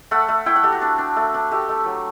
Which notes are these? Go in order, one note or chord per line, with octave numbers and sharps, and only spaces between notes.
A3 F#5
A3
E4 G5
F#5
A3 G4
F#4
D4
D4
A3
D4
A3 G4
A3
F#3